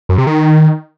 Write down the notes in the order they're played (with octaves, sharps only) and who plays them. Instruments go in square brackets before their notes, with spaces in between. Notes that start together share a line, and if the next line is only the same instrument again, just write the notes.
[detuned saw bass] F#2
C3
D#3